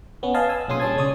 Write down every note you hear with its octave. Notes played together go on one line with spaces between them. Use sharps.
B3 C#4
B4 D#5 F5 G#5 A5
G#5 E6
B1 A#2 C#4 G#4 C6 D#6
G3 C#4 A5 G#6
C#2 G#3 C#4 C#5 D5 D#6